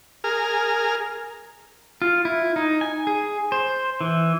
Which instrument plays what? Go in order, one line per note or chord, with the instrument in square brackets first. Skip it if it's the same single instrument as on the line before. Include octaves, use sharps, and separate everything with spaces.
[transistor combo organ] G#4 A#4 F6
[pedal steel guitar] F4
E4
D#4
G#5
G#4
C5
E3